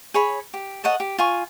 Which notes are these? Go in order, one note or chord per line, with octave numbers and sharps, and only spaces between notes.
G#4 C#5 B5
G4
A4 C#5 D#5 F#5
G4
F4 G#5 C#6